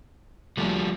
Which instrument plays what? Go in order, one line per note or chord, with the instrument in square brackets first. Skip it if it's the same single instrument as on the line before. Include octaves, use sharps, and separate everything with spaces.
[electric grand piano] D2 A3 A#3 [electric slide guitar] F3 G3